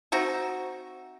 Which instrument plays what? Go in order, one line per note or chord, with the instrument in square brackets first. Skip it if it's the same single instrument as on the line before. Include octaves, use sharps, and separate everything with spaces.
[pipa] C4 D#4 F#4 E5